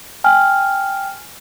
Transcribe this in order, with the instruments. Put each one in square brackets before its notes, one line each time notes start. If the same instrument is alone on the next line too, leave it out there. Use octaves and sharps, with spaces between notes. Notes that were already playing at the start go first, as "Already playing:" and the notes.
[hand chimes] G5 G#5 F6